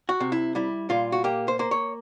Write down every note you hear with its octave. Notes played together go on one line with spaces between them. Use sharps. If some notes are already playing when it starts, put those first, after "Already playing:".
F#4
C3
E4
G3 E4
A#2 F4
F#4
A#3 G4
C5
A#3 C5
C#5